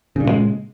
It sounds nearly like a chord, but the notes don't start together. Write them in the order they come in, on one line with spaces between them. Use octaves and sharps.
C#3 G2 A#2 G#3